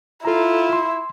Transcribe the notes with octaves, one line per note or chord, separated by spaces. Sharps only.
E4 F4 A4 A#5
C6